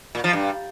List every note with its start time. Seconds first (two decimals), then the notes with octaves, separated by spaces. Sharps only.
0.15 A#2
0.24 F3
0.33 G2